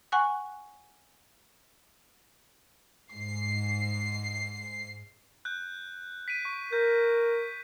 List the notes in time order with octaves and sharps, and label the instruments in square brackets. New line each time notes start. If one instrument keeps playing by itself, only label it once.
[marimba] F#5 G#5 C#6 F#6
[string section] G#2 C7
[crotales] F#6 G6
B6 D7 D#7
C#6
[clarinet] A#4 [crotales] G6